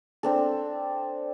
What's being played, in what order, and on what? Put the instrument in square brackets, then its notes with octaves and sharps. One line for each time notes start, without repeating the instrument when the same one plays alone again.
[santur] C4 D4 A4